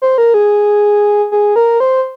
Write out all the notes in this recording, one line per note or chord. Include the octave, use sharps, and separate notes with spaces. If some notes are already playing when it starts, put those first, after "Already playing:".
C5
A#4
G#4
G#4
A#4
C5